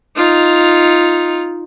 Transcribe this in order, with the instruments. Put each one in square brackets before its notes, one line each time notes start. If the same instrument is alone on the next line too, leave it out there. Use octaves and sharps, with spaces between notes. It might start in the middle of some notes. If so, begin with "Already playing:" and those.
[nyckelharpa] D#4 F4